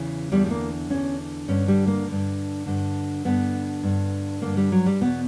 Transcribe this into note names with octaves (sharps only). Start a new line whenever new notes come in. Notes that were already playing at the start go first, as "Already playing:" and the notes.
Already playing: E2 C#3 E3
E2 D3 G3
G3
A#3
E2 D3 C#4
G2 D3 C#4
G3
A#3
G2 D3
G2 D3
G2 D3 B3
G2 D3
G2 D3 A#3
G3
F#3
G3
E2 B2 B3